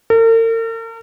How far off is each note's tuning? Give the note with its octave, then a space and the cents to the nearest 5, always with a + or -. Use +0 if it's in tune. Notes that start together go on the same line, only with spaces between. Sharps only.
A#4 -45